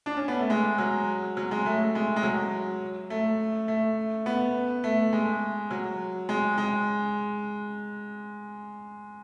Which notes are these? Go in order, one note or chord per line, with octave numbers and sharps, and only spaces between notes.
D4
C#4
B3
A3
G#3
F#3
F#3
G#3
A3
G#3
G#3
F#3
A3
A3
B3
A3
G#3
F#3
G#3
G#3